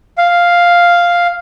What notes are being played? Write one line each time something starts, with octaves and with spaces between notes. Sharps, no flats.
F5